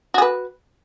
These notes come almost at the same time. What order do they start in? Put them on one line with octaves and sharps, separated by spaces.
F#4 G#4 B4